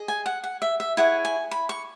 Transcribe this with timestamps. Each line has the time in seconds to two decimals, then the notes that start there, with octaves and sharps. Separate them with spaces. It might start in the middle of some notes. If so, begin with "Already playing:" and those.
Already playing: G#4 D#5
0.08 G#5
0.26 F#5
0.44 F#5
0.62 E5
0.80 E5
0.97 E4 G#4 C#5 F#5
1.25 G#5
1.51 B5
1.69 C#6